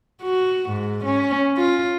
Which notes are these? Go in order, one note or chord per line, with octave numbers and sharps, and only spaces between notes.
F#4
G#2
C#4
F4